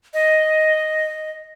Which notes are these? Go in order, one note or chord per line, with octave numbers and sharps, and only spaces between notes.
D#5